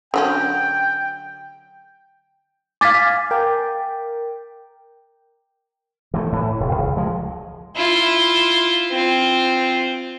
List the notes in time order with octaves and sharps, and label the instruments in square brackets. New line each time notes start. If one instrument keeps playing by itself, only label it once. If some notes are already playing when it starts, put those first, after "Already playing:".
[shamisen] D3 F#3 C#4 [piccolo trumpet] G5
[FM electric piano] F5 G#5 [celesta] D6 A6 B6
[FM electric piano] A#4 G5
[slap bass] E3 G3 A3
A2 E3
E1
C#2
F3 G#3
[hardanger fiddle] E4 F4
C4 F4